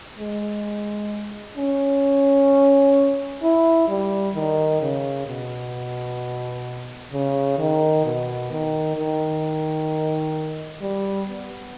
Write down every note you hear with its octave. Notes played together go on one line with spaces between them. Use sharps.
G#3
C#4
E4
G3
D#3
C#3
B2
C#3
D#3
B2
D#3
D#3
G3
B3